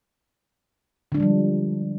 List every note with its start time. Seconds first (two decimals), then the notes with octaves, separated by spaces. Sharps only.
1.12 D3
1.15 D4
1.17 G#3
1.20 F3
1.23 G3